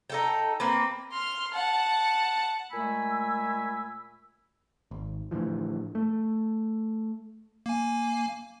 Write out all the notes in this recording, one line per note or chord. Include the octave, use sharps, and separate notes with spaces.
D#4 A4 G5
A#3 C4 B4
C6 F6
F#5 A5
A#2 G#3 A3 G#5 B5 E6
G#1
A2 D3 E3 F3
A3
A#3 G#5